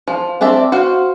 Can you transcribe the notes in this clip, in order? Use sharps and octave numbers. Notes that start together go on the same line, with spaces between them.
F3
C4 D4 D5 E5
F#4 C5 F5